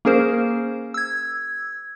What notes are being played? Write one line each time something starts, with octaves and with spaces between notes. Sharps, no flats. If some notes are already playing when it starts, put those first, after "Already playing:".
A#3 C#4 G#4 A#4 C5
E6 G#6